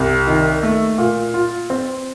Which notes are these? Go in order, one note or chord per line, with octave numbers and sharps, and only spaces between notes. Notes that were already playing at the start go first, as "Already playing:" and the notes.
Already playing: C2
D#3
A3
A#2
F4
C4